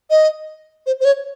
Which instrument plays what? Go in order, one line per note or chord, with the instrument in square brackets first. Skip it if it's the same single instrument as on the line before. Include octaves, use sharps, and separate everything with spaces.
[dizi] D#5
C5
C5
C#5